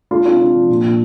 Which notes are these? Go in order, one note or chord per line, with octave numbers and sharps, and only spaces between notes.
G#3 D4 F4
C3 D4 F4
C3 D4
F3
A#2
A#2